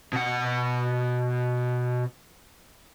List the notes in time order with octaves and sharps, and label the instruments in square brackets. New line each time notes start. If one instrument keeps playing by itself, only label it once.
[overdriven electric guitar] B2 F#5